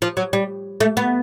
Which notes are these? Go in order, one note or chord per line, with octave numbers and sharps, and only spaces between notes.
F3
F#3
G3
A3
B3